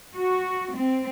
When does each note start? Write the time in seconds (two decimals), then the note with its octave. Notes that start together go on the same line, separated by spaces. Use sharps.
0.15 F#4
0.74 C4